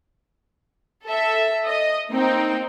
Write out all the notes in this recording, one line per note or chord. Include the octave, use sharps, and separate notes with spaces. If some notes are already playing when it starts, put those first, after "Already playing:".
A4 E5
D#5
A#3 C4 D#4 G5